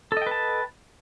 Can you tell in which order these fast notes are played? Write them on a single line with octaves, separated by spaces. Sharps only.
A4 D#5 G5 B4 A5